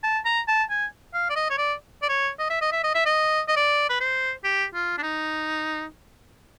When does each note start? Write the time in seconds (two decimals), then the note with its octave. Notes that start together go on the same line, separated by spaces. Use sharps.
0.03 A5
0.25 A#5
0.48 A5
0.70 G#5
1.14 F5
1.30 D5
1.36 D#5
1.50 C#5
1.58 D5
2.02 D5
2.09 C#5
2.39 D#5
2.50 E5
2.61 D#5
2.72 E5
2.84 D#5
2.95 E5
3.06 D#5
3.48 D#5
3.56 D5
3.89 B4
4.00 C5
4.44 G4
4.74 F4
4.98 D4
5.03 D#4